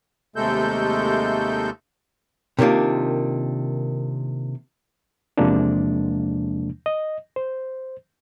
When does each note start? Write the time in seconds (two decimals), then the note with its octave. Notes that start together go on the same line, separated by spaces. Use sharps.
0.36 D#2 C3 G#3 A3 A4 G6
2.59 C3 D#3 A#3 D4 F4
5.38 E2 C3 F3 G#3 A#3 D4
6.86 D#5
7.36 C5